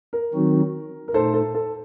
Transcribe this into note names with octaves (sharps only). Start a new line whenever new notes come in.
A#4
D#3 F#3 C4 D#4 F#4
A#4
A#2 A3 D#4 A4 C5
A4
A4